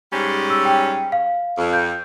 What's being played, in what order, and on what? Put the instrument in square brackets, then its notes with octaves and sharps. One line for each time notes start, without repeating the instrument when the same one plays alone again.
[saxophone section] G#2 G3 C#4
[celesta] E6
G5
F5
[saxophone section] F2
[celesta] G6